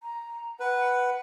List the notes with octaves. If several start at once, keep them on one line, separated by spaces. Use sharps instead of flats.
A#5
B4 F#5